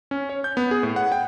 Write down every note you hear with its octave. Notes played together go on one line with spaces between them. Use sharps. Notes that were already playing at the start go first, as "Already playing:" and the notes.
C#4
C#5
G6
B3
G#4
A2
F#5
G5